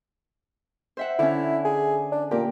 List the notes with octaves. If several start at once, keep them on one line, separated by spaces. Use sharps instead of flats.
C5 E5 F#5
D3 C#4 E4
G#4
D4
A#2 A#3 G4